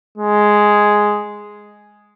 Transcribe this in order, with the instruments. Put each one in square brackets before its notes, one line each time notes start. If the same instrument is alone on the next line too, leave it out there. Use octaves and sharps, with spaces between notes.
[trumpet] G#3